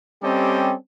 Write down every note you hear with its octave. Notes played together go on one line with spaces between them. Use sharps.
G3 C4 C#4 G4 A4 D#5